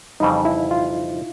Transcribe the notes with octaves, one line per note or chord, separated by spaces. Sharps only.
F2 C#3 E3 G3 D#4
E4
F4